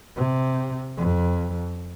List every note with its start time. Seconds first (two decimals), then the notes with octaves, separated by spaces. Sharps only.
0.16 C3
0.97 F2